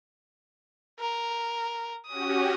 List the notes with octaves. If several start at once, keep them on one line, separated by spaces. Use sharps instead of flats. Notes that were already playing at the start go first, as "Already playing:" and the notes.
A#4
C#4 F#4 G4 D#6